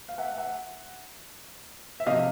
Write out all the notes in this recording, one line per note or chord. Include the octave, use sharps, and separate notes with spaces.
F5
E5 F#5
E5 F#5
E5
C3 F3 A3 D#5 F5